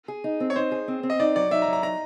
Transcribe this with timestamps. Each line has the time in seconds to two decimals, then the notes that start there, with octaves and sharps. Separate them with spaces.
0.08 G#4
0.24 D#4
0.40 C4
0.50 C#5
0.56 D#4 C5
0.71 G#4
0.88 C4
1.03 C4
1.10 D#5
1.20 D#4 D5
1.36 F#3 D5
1.51 D#4 E5
1.62 A#5
1.68 F#3
1.73 A#5
1.83 D#4 A#5